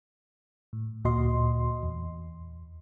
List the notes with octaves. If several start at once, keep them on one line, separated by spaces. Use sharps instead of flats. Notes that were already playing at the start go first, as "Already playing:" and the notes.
A2
D2 A#2 F#4 D#5 C6
E2